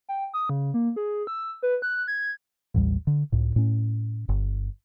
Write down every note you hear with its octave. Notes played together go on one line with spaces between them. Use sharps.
G5
D#6
C#3
A#3
G#4
E6
B4
F#6
G#6
A1 D#2 G3
D3
C#2 A2
A2 C#4
G1